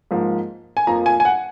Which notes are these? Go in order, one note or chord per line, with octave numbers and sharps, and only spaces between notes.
G#2 F3 A#3
G#5
F2 F3 A#3 A#5
G#5
G#5
F#5